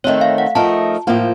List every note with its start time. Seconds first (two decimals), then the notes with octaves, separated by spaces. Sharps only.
0.04 D#3 A3 C4 C#5
0.21 F5
0.38 F#5
0.55 F3 A3 D#4 A#4 A5
1.07 A2 F3 A#3 F4 C5